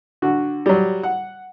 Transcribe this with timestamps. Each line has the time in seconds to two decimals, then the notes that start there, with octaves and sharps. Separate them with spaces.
0.22 D3 F#4
0.66 F#3 G3
1.03 F#5